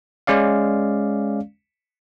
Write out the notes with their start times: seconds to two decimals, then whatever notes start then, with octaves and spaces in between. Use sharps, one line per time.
0.27 G#3 C#4 D5 F5